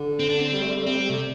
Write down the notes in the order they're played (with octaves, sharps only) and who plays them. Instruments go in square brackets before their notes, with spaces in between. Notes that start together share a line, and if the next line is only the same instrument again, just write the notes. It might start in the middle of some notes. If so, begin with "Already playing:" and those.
Already playing: [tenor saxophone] D3
[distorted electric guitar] C4
D4
C4
[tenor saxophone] G3
A3
G3
A3
[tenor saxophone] G3 [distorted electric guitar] C4
[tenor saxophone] G3
[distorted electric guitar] C3 [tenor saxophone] A3